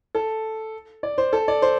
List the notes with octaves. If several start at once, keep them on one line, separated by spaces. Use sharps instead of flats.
A4
D5
C5
A4
D5
C5